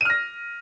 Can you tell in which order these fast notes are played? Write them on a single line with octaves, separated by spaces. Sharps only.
D#7 F6 A#6